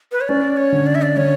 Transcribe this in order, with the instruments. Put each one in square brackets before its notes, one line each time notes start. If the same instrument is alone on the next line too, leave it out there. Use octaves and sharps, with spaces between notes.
[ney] B4
C#5
[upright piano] C#4 [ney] D5
[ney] C#5
[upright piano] D3
[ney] D5
E5
D5
[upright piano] D3 [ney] C#5